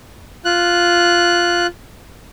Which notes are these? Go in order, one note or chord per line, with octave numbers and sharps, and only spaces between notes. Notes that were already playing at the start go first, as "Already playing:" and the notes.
F4 F#6